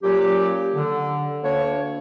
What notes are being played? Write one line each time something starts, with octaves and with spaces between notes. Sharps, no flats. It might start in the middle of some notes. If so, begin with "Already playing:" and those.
A#2 F#3 A#3 C#4 G4
D3
D2 A#3 D4 C#5